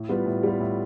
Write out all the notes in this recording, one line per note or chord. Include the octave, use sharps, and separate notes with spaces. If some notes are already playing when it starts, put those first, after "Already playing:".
Already playing: A2
G3 B3 F4 B4
A2
G3 B3 F4 B4
A2